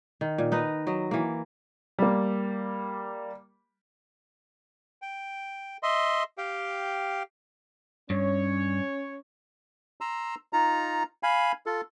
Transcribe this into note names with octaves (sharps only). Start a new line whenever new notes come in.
D#3
A#2
D#4 B4 D#5
F#3 D#5
E3 A#3
G3 A#3
G5
D#5 E5 C6
G4 F5 G5
G2 C#4 C#5
A#5 C6 E6
D#4 F4 A#5
F5 G#5 B5
F4 A4